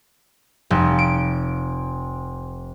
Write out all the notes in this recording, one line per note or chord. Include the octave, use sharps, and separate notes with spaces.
F1
D7